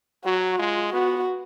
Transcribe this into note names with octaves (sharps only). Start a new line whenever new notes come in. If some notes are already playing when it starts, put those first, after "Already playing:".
F#3 F#4
G#3 F4
B3 F#4